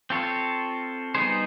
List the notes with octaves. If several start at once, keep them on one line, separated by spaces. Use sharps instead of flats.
C4 F4 A4 C#5
G3 B3 D#4 G#4 C5